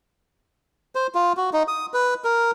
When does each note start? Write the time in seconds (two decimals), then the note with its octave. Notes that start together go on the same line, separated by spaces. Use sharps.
0.95 C5
1.15 F4
1.37 F#4
1.53 D#4
1.68 D#6
1.94 B4
2.24 A#4